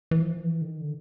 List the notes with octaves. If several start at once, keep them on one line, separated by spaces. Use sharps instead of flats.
E3
F3
E3
D3
D#3
D3